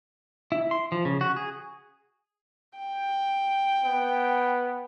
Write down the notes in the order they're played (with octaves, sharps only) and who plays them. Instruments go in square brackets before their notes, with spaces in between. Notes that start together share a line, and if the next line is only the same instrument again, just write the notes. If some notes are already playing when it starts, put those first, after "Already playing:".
[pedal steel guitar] E4
C6
F3
C#3
F#4
G#4
[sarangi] G5
[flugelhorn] B3